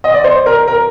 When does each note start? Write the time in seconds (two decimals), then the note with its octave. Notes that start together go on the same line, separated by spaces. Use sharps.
0.04 D#5
0.14 D5
0.24 C5
0.46 A#4
0.68 A#4